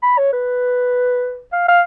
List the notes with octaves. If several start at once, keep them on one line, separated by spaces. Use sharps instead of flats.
B5
C#5
B4
F5
F5